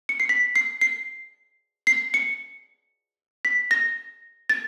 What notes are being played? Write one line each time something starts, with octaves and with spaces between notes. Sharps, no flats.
C#7
C7
B6
C7
C7
C7
C#7
B6
A#6
A6